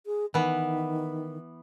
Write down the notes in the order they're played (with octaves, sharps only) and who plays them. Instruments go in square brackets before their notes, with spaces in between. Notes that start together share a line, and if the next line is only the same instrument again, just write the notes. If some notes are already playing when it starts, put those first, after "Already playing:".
[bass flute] G#4
[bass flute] D#3 [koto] E3 B3